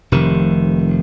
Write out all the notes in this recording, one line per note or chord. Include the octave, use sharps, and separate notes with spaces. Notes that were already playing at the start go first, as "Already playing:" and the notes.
F1 C3 D#3